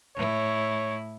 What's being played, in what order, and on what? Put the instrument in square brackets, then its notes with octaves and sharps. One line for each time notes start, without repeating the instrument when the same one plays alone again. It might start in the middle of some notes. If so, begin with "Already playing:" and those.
[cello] A2 E4 [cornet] C#5